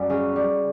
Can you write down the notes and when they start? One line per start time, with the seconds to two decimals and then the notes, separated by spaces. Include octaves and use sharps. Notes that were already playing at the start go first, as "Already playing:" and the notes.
Already playing: F#2 G3
0.10 C#3
0.36 G3